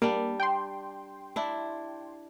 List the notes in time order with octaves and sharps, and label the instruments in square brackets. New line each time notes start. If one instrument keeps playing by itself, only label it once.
[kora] G3 D4 [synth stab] A#3
[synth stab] G5 C6
[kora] D4 E4